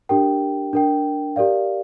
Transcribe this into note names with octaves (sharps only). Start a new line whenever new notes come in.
D4 G4 A#4 G5
D4 A#4 G5
G4 A#4 D5 F5